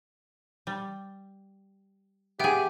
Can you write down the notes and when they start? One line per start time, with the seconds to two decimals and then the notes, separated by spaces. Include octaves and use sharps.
0.67 G3
2.40 B3 G4 G#4 E5 F#5 G5